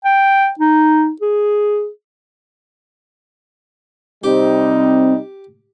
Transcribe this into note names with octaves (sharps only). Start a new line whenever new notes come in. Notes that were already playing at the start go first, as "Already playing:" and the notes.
G5
D#4
G#4
C3 G3 C4 D#4 G4